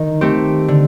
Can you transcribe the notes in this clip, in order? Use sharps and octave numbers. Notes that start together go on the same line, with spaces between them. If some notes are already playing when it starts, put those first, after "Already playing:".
Already playing: D#3 A#4
A3 C4 G4
D3